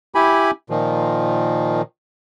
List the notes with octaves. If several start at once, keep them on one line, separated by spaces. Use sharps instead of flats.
E4 G4 G#5 B5
A#2 D#3 F3